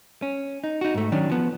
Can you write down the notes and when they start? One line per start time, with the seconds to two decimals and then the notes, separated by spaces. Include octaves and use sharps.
0.22 C#4
0.64 D#4
0.81 D#4 F#4
0.94 G#2 A3
1.12 D#3 F#3 C#4 D4
1.30 F3 B3